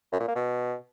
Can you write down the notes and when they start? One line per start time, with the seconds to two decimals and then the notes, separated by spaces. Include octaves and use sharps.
0.12 F#2
0.20 A#2
0.28 A#3
0.35 B2